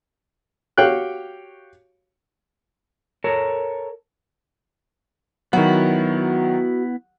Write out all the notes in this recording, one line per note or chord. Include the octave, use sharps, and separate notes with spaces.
F#4 G4 C#5 F5 G5 F#6
A4 A#4 C#5
D#3 F#3 B3 E4 F#4